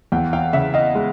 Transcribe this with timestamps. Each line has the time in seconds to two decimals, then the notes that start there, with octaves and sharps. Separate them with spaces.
0.12 E2 F5 G5
0.33 F5 G5
0.53 C#3 E5 F#5
0.74 D#5 F5
0.95 G#3